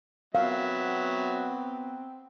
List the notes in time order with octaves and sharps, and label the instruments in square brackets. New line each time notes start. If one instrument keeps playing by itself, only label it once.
[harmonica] F#3 E5 [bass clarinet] B3 [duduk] C4 [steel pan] F5